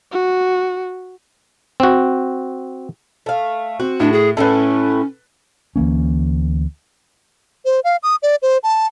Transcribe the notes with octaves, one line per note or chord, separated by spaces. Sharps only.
F#4
C4 F#4
A3 F5
C4 F#4
A2 D4
G#4
A2 A3 C#4 E4 A4 B4
D2 E3 A#3 C#4
C5
F5
D#6
D5
C5
A5